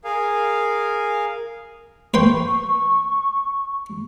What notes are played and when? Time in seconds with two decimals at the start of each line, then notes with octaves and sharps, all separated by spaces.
0.04 G#4 A#4 F5 G#5
2.14 B4 G5 C6 C#6